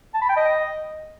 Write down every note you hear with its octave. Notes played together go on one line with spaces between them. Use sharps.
A5
B5
G5
D#5